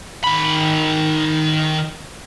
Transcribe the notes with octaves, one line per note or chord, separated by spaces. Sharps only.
D#3 B5